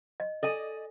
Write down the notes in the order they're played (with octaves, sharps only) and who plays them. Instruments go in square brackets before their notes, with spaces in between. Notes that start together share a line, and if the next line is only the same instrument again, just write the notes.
[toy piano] D#5
[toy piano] A4 [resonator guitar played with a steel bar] D5 D#5 G#5